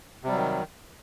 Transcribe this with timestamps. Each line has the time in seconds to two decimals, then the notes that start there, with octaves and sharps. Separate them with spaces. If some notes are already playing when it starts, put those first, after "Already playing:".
0.23 C3
0.28 G3
0.32 F#3
0.36 D#3